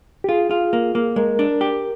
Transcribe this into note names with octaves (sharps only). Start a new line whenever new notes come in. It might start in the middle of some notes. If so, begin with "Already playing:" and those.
G4
F4 G#4
F4
A#3
A#3
G#3 A#4
D4
G4